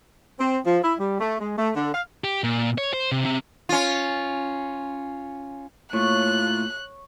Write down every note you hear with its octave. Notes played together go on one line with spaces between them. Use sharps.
C4
F3
E4
G3
A3
G#3
A3
D3
F5
G4
A#2
C#5
C5
C3
C3
C#4 F4
A2 A#3 F4 C#5 F#6